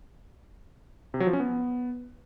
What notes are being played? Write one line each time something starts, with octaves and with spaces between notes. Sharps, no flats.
C3
F#3
F3
C#4
B3